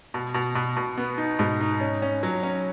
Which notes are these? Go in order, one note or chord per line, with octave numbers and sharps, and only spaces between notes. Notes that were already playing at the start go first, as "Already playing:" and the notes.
B2
B2
B2
B2
B3
D#4
G#2 B2
D#4
C#4
C#4
F#3
C#4